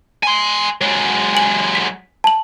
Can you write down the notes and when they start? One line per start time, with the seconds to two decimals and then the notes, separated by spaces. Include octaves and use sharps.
0.23 G#5 C6
0.81 F#3 G#3
1.35 G#5 F#7
1.75 B6
2.24 A5 F#7